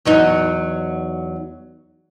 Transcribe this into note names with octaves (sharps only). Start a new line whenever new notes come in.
E2 F#3 D#4